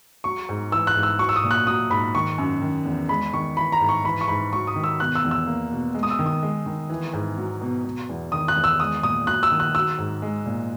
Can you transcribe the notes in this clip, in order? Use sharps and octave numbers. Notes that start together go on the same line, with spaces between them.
F#3 C#6
G#2
E3 E6
F#6
G#2
E6
F#3 C#6
E6
D#6
A#2
F#6
F#3 D#6
G#2 B5
D#3 C#6
F#2
D#3
E2
G#3 B5
D#3 C#6
E3 B5
A#5
G#2
C#6
E3 B5
C#6
G#2 B5
F#3 C#6
D#6
D#3
E6
B2 F#6
E6
E2
E6
A#3
B2
G#3
D#6
E6
D#3
D#6
G#3
D#3
E3
G#2
F#3
B2
B2
E2
D#3 D#6
F#6
E2
E6
G#3 D#6
A#2 D#6
F#3 F#6
E6
D#3
F#6
F#3 E6
G#2
G#3
A#2